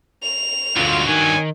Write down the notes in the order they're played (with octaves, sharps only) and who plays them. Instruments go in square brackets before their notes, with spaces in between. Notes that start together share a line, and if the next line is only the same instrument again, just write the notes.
[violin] F7
[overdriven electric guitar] D2 F4 [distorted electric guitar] G2 F#3
[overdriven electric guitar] D#3 [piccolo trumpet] G#5